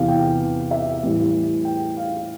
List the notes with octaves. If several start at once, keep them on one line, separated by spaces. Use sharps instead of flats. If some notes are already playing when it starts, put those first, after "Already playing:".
Already playing: E2 C3 E3 F5
G5
E5
A2 E3 G3
G5
F5